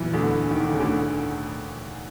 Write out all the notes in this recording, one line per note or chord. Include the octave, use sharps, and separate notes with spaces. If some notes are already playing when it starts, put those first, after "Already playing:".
Already playing: E2 A#2 E3 F#3 B3 E4
D2 D3
D#3
D3
C#3
D2 D3